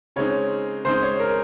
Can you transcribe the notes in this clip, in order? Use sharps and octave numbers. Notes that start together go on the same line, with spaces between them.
C#3 G#3 C4 D#4 C#5
C#3 G#3 C4 D#4 C5
C#5
A#4